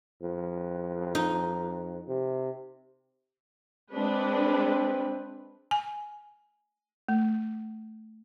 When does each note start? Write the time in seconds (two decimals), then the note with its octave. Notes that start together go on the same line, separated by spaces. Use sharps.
0.22 F2
1.15 D#4
2.07 C3
3.94 G#3 C4 D4 B4
5.71 G#5
7.09 A3